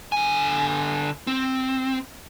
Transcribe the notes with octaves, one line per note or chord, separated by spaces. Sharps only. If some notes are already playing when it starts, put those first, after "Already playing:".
D3 G#5
C4